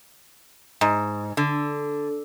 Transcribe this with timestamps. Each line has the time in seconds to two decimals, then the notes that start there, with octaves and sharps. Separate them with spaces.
0.81 G#2
1.37 D3